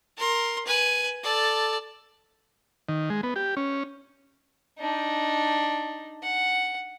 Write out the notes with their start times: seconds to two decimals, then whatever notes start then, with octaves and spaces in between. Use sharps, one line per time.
0.17 A#4 C6
0.66 B4 G#5
1.23 A4 D5
2.89 D#3
3.10 G#3
3.23 B3
3.36 G4
3.57 C#4
4.79 D4 D#4
6.23 F#5